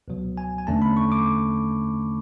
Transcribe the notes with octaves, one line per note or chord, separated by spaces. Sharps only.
C#2 B2 F#3
G#5
G#5
E2 D3 A3 C#4 A5
B5
C#6
D6